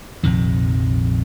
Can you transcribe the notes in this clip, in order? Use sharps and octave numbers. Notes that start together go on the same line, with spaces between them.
A#1 F2 C3 D#3